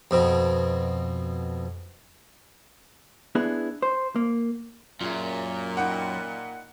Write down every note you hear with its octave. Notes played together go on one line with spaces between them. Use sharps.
F2 B2
B3 D4 E4 G#4
C5
A#3
F#2 A#2 F4 G#4 E5
D#4 F#5 G5 B5